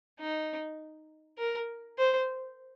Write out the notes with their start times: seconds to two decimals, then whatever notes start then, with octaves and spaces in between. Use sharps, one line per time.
0.20 D#4
1.39 A#4
1.98 C5